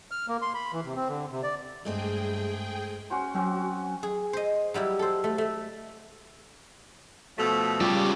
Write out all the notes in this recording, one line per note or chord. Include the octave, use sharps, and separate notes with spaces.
F6
A#3
C6
B5
E3
C3
C4
D3
C3
D5
G2 G#3 A3 C4 G#4 G5
C#4 F#4 C5
F#3 C4 C#4 F#4
G#4
C5 D#5
F#3 G3 E4 G4
A4 C5
A3
A3 E5
B2 F3 A3
C#3 G3 F4 G4 A4